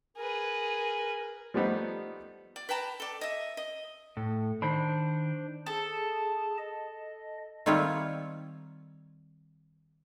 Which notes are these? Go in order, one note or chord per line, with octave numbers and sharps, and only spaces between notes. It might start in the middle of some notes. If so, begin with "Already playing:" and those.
G#4 A#4 B4
F3 G3 A3 B3 D#4 C5
D5
B4 G5 A5 A#5
A4 D5
D#5 E5
D#5
A2 A4
D#3 D4 D#4 C5 B5
G#4 A4 A5
D#5
D#3 G3 C4 F4 C#5 E5